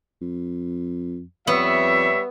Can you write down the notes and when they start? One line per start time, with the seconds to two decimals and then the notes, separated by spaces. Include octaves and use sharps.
0.22 F2
1.47 F2 G3 B3 C#5 E5